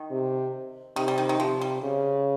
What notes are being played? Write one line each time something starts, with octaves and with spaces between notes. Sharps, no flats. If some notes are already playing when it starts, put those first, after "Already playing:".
Already playing: D#3
C3
C3 D#3
G3
D#3
D#3
C3 F3
G3
C#3